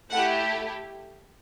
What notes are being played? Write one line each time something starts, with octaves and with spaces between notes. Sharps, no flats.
A3 E4 G4 F#5